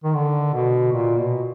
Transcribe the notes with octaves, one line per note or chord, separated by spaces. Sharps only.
D#3
D3
B2
A#2
B2